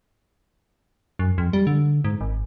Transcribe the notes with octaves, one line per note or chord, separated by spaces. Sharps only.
F#2
F2
G3
D3
G#2
G#1